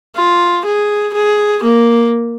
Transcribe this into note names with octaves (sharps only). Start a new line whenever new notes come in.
F4
G#4
G#4
A#3